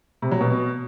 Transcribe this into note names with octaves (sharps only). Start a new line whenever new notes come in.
C3
F#3
B2